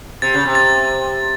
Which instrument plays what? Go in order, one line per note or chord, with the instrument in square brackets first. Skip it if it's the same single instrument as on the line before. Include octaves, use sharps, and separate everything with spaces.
[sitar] C3 [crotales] A6
[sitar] C#3
C3
[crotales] A6